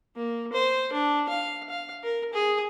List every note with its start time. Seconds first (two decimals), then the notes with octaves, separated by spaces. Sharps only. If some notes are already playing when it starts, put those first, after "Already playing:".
0.16 A#3
0.52 C5
0.93 D4
1.29 F5
1.69 F5
2.04 A#4
2.33 G#4